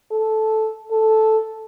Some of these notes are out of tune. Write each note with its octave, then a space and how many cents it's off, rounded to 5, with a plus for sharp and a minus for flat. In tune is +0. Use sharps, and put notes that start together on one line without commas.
A4 -10
A4 -5